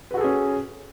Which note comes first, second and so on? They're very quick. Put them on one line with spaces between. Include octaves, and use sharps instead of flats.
B4 F#4 A4 G#4 C#4